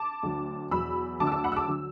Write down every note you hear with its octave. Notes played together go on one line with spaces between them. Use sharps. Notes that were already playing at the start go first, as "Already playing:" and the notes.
Already playing: A5 D6
D2 D3 F#3
E2 B2 F#3 B5 E6
D2 D3 F#3 A5 D6
E6
A5 D6
F#5 B5
E6
A5 D6
D3 F#3